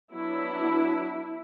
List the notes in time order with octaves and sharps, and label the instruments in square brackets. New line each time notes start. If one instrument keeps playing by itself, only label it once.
[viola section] F#3 B3 D4 E4